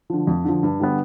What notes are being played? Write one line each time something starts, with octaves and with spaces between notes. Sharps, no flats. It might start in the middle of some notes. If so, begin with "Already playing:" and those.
D3 F3
F2
D3 F3
G2
D3 G3 B3